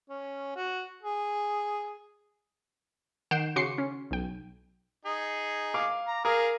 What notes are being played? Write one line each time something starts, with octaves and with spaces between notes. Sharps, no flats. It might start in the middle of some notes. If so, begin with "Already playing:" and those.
C#4
F#4
G#4
D#3 F#5 G6 C7 D7 E7
C#3 F#4 C6 D6 C7 C#7
C#4
B1 G5
D#4 G#4
F5 D6
A#5
G#4 A#4 F5 A#5